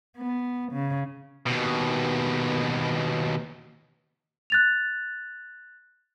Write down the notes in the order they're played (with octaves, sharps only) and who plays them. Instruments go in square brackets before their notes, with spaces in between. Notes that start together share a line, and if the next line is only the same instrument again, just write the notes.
[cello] B3
C#3
[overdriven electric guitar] D#2 B2
[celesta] F#6 A6 F7